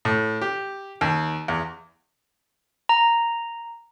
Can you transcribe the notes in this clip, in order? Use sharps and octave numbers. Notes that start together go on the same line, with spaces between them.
A2
G4
D#2
E2
A#5